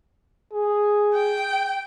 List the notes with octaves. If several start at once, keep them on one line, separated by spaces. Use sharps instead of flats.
G#4
G5